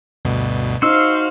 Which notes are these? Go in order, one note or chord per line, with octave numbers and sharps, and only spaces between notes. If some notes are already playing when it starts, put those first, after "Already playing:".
D2 G2 B2
D#4 F#4 C5 F5 C6 E6